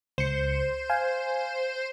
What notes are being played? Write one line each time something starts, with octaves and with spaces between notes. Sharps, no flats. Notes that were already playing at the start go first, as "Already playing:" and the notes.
C#2 C5 C#7
F5 G#5